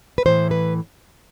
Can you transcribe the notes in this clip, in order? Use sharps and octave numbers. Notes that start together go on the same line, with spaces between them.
B4
A2 E3 C5
B4